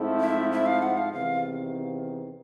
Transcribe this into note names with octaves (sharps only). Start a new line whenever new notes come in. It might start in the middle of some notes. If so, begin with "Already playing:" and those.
Already playing: G#2 F3 A3 C4 E4
E5
E5
F5
F#5
F5
E2 C3 D#3 F5